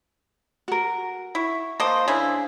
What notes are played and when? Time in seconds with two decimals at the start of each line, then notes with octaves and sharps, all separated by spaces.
0.68 F#4 A#4
1.35 E4 C#6
1.80 A#3 C5 D#5 F5 A5 C6
2.08 C#3 D4 E4 F5 G#5